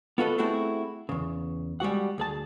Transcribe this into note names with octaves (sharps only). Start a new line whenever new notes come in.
B3 F4 F#4 A4 B4 D#5
A3 C4 E4 F#4 G#4 A4
E2 C#3
G3 G#3 F#4 F#5
D2 G#4 A5